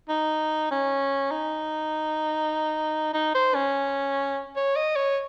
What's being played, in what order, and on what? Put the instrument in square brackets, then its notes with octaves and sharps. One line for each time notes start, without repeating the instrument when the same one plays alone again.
[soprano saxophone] D#4
C#4
D#4
D#4
C5
C#4
C#5
D#5
C#5